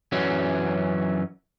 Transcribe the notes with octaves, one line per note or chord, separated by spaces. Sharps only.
F#2 E3 F#3 C#4